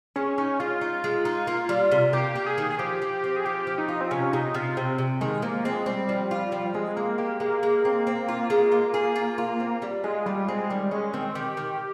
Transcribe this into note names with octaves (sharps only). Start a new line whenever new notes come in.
G#3 C#4
C#4 D#4
G#3 F4
D#4
G#3
D#4
A#3
G3
C3
A#3 G4
A#3
G#4
D#3
G#4
F3 G4
F3
C4
G#4
F3 G4
F3
D#4
F4
C4
C3 C#4
C3 D#4
C3 F4
C3 C4
C3
D#3 G#3
F3 A#3
G#3 C4
G3 C4
F3
F4
F3
G#3 C4
G#3 A#3
A#3 G4
G#3 A#3
G#3
C4
C4
F4
G#3
F4
G#4
F4
F4
C4
G3
G#3 F4
G3 F4
G#3 C4
D#3 G3
G#3 C#4
D#3 C4
D#3 G4
D#3